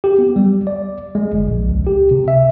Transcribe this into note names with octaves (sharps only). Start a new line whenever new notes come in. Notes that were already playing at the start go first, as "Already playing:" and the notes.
G4
B3
G3
D5
G#3
G1
A#1
C#2
G4
C3
E5